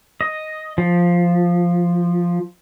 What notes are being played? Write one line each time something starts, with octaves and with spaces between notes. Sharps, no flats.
D#5
F3